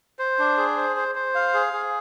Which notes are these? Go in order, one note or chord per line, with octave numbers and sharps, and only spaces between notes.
C5
D4
G#4
C5
C5
C5
F5
G#4
G#4